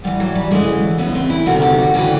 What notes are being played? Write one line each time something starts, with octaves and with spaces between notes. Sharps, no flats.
G#2 E3 G3
F#3
G3
D2 C#3 E3 G#3
E2 C#3 E3 B3
C4
E4
D2 C3 D#3 F#4
G4
F#4
D2 C#3 E3 G4